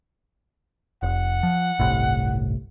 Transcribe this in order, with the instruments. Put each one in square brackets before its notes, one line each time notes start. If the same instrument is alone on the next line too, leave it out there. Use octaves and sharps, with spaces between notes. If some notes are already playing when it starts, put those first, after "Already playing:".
[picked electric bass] F1 [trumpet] F#5
[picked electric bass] F3
G1 C2 A2